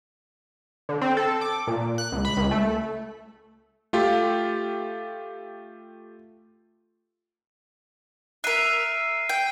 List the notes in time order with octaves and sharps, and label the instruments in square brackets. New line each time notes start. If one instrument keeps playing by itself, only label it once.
[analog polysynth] D3
C4
A4
D6
A#2
F#6
C#2
B5
C#2
A3
[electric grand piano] A3 F4 G4
[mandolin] A#4 E5 [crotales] F#6 C7 D#7
[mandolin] G5